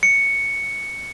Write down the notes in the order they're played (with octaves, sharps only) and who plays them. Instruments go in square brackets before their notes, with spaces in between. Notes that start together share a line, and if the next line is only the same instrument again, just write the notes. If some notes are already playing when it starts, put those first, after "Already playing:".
[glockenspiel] C#7